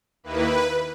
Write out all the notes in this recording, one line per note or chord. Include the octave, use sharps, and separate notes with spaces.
D#2 D#3 A#3 E4 B4